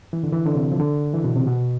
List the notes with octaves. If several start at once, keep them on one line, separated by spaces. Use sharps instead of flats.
E3
D3
E3
D3
C3
F3
D3
E3
B2
C3
B2